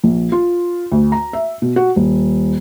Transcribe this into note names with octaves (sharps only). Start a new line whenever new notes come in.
A#1
F4
D2
A#5
E5
B2
F#4
D#1